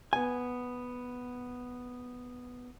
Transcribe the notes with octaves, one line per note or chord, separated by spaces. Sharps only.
B3 G#5